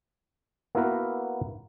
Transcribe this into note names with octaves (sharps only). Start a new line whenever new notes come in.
A#3 B3 E4 F#4 A#4 B4